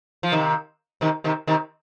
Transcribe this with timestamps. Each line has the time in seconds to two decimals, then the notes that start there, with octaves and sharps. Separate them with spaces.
0.23 F3
0.32 C3 D#3
1.01 C3 D#3
1.24 C3 D#3
1.47 C3 D#3